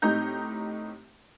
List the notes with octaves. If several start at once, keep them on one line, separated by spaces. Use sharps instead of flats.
A2 C4 D#4 G4 A#5 G6